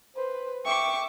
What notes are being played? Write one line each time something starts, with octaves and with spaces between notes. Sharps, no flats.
B4 C5
E5 G5 C#6 D6